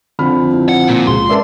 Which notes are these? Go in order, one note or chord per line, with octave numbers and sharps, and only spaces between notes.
F2 D3 B5 F6
E4
F#5
A#2
C#2 C6
C#2 A#4 B4 D5 E5 A5